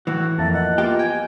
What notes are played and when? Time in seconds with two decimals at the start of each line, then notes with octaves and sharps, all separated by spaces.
0.07 A2 E3 F#4
0.39 F2 A#3 E5 A5
0.54 D#5 F#5
0.78 A#3 B3 F4 G4
0.99 G5 G#5